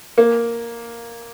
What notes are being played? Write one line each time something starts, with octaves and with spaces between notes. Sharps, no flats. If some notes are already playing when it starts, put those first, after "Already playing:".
A#3